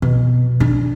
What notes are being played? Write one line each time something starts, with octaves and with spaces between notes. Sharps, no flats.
B2
D4